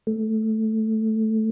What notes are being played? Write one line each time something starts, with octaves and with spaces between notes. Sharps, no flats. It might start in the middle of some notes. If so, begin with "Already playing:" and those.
A3